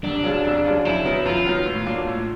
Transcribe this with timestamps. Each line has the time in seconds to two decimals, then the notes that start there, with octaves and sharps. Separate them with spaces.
0.04 F1 D4
0.24 D#2 C#3 F#3
0.44 F1
0.65 D#2 C#3 F#3
0.85 F#2 E4
1.05 D#3 F#3 B3 D#4
1.25 F#2 F4
1.46 D#3 F#3 B3 D#4
1.66 A2
1.86 F#3 A#3 D4
2.07 A2